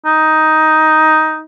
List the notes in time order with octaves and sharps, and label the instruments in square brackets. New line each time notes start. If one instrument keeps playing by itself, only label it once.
[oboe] D#4